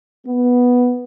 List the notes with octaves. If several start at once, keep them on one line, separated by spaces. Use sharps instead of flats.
B3